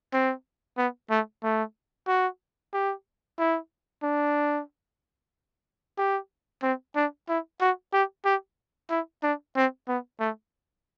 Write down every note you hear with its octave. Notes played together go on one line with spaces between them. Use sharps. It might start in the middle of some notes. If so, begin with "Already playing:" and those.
C4
B3
A3
A3
F#4
G4
E4
D4
G4
C4
D4
E4
F#4
G4
G4
E4
D4
C4
B3
A3